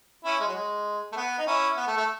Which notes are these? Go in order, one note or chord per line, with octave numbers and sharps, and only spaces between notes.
C#4 E4
G#3
F#3
G#3
A3
B3
D#4
C#4 E4
B3
A3
A3